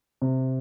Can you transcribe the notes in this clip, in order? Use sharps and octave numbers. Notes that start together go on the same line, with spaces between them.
C3